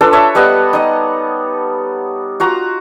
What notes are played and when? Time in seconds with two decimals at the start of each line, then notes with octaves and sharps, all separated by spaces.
0.01 D4 F4 A4 B4
0.13 C#5 E5
0.35 G3 B3 D#5 F#5
0.73 D#4 D#5
2.40 F4 F#4 A#5